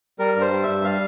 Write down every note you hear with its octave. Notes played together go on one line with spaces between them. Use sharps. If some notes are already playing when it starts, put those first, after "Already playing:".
G3 A#4
G2
C5
G3
E5
G2
G3 F5